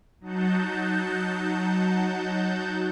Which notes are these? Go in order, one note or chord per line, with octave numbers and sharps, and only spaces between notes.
F#3 D#4 F#5 A5 G6